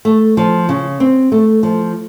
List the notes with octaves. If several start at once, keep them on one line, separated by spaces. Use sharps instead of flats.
A3
F3
C#3
C4
A3
F3